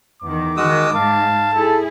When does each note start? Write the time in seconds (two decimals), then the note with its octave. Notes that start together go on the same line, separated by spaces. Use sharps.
0.22 E2 D#3 D6
0.57 D#3 G#3 F#4 D#6 E6
0.95 G#2 F5 A5
1.54 E4 G#4 A4